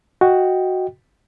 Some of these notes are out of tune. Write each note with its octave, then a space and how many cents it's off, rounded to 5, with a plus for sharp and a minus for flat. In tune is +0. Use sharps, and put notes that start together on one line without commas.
F#4 +0 D#5 +10 G5 +0